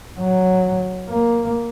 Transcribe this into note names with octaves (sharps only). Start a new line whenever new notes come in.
F#3
A#3